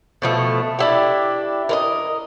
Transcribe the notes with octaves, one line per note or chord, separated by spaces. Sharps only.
B2 F3 A3
D4 E4 G4
A#4 B4 D#5